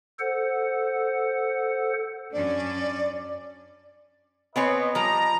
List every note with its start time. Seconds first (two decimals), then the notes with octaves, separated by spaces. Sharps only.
0.20 A4 C5 F#5
2.33 F#2 C#4 D4 D5
4.56 B3 C4 B4 C#5 D#5 G#5 B5 D7
4.95 F3 G3 A#5